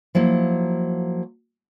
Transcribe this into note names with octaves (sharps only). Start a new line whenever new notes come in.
F3 F#3 A#3 E4